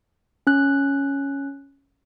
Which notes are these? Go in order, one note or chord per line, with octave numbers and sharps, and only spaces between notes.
C#4 F#6